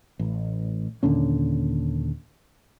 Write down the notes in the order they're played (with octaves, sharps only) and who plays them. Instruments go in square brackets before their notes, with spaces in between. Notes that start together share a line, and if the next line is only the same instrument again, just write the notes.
[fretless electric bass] A1
D#2 A#2 D3 C#4